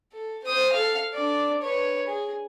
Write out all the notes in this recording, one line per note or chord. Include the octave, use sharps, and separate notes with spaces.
A4
C5 D#6
A4 F5
D4 D5
B4 C#5
G#4